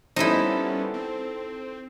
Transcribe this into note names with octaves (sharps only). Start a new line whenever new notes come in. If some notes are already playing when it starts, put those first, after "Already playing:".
G3 B3 C#4 D#4 E4 A4 C5
C4